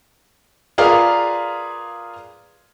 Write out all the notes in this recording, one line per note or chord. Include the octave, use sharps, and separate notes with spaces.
F4 G#4 A#4 B4 D5 F5